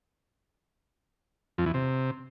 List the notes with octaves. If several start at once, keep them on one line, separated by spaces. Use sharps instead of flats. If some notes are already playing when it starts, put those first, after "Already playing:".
F2
E2
C3